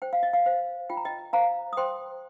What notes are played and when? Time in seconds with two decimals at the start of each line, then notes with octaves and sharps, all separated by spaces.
0.02 C5 G5
0.13 F5
0.23 D#5
0.33 F5
0.46 C5 F5
0.90 F4 G5
0.97 A#5
1.05 D#5 G5
1.33 C5 F5 A#5
1.73 D#6
1.77 C5 G5 C6